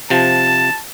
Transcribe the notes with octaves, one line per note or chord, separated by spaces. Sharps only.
C3 F3 A5